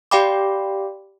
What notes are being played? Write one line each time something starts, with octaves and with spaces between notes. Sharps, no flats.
G4 D5 F5 G5 B5 D6